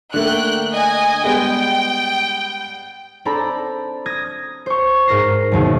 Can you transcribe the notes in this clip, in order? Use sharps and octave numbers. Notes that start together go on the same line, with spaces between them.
D3 A3 A#3 G5 F#6
D#5 G#5
G3 G#3 B3 G5
C4 D4 A4 D5 A#5 B5
D#6 G#6 A#6
C5 C#6
G#2 A#4 A#6 C7
F#1 D#2 B2